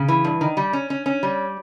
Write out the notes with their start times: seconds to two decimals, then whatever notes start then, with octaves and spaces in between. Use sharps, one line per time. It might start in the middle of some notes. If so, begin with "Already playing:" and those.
Already playing: C#3
0.08 E3
0.25 G2
0.41 D#3
0.57 G3
0.73 C#4
0.90 C#4
1.06 C#4
1.23 G3